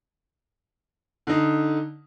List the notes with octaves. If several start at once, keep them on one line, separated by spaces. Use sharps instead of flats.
D3 D#4